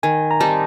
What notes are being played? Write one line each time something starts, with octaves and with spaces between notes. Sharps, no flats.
D#3 G#5
A#5
G3 C4 D#4 A5